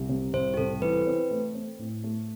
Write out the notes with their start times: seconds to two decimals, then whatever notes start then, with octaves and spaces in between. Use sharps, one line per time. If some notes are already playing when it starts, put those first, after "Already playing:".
Already playing: C2
0.09 C3
0.33 C2 C5
0.54 G4
0.57 C2 A4
0.82 E3 B4
1.07 C4
1.31 A3
1.55 C4
1.79 A2
2.04 A3